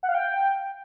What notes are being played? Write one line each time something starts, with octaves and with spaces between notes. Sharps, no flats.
F#5
F5
G5